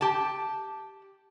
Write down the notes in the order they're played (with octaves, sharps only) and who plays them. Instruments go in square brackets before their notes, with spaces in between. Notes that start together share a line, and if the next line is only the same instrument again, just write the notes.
[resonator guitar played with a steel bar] G4 A5